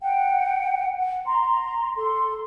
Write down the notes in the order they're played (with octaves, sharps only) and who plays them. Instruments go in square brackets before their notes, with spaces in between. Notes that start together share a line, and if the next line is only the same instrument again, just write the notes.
[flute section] F#5 G5
F#5
A#5 C6
A4 C6